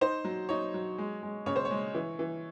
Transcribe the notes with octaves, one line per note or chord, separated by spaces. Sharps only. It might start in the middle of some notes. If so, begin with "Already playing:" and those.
D#4 C5
F#3
D#4 C#5
F#3
G#3
G#3
C#3 C#5
C5
C#5
G#3
E3
E3